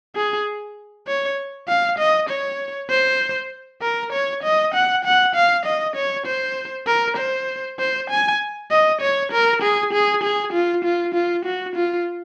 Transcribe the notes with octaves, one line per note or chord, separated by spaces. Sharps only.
G#4
C#5
F5
D#5
C#5
C5
A#4
C#5
D#5
F#5
F#5
F5
D#5
C#5
C5
A#4
C5
C5
G#5
D#5
C#5
A#4
G#4
G#4
G#4
F4
F4
F4
F#4
F4